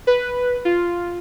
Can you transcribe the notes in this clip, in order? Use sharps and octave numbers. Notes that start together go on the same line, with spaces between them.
B4
F4